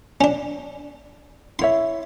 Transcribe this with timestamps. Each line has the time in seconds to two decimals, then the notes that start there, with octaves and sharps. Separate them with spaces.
0.21 C#4 D4
1.59 E4 C#5 E5 C6